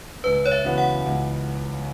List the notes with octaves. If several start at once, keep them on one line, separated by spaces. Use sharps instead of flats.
C#2 B4
C#5
E5
C#3 E3 B3 F#4
F#5
C#2